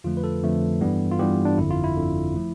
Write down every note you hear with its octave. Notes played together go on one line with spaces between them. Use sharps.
F2 D3 F3 A3 F4
B4
A4
F2 D3 F3 A3
G2 E3 G3 B3
F4
G2 E3 G3 B3 G4
D4
G1 F2 D3 E4
F4
E4
G1 F2 D3
F3 A3